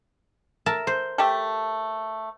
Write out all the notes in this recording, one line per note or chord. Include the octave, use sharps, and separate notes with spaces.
A#4 E5 A5
C5
A3 G4 A4